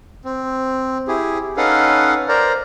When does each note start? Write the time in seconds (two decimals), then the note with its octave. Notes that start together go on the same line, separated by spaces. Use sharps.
0.25 C4
1.08 E4 G4 G#4
1.57 C#4 D#4 A4 B4 F5 F#5
2.28 A#4 C5 D5 A#5